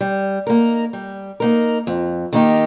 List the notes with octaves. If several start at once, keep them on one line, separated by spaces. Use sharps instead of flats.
G3
A#3 D#4 A#4
G3
A#3 D#4 A#4
F2
D#3 A#3 D#4 G4